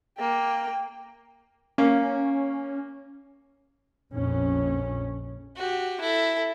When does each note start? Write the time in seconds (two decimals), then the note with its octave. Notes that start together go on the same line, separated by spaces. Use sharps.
0.18 A#3 G5
1.78 A#3 C#4
4.13 A#1 F2 C#4
5.56 F#4 G4
6.00 E4 A4